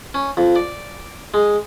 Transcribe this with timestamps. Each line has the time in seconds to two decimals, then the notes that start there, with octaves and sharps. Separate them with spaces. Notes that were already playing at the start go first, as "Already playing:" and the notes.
0.14 C#4
0.37 F2
0.56 D5
1.34 G#3